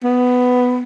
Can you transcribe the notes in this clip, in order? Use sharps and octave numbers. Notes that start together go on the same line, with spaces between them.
B3